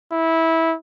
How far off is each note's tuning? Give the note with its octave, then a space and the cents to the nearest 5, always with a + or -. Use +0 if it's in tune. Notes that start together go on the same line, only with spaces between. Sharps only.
E4 -15